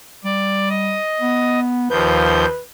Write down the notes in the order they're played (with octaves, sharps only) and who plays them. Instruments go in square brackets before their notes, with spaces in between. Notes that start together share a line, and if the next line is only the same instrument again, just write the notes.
[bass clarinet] G3 [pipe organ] D5
[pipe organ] D#5
[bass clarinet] B3
[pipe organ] D#2 F3 G6 [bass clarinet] B4